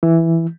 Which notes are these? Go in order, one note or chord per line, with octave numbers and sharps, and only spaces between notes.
E3